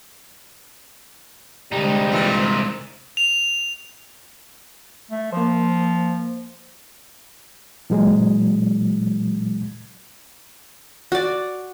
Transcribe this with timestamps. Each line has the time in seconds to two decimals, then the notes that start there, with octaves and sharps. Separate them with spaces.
1.72 C2 D3 G3 G#3 D#4 C5
2.12 A#2 E3
3.17 F7
5.11 A3
5.33 F3 A#3 C5
7.90 A#2 E3 F#3 G#3
11.12 F#4 D5